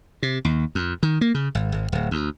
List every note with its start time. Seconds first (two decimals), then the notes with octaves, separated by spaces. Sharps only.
0.23 C3
0.45 D#2
0.75 F2
1.03 D#3
1.21 A#3
1.35 C#3
1.55 G#1
1.72 G#1
1.92 D1
2.11 D2